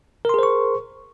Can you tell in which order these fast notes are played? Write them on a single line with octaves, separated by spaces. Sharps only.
A#4 C6 G#4 C5 C#6